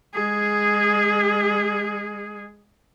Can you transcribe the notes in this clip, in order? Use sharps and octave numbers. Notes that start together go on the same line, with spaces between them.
G#3 G#4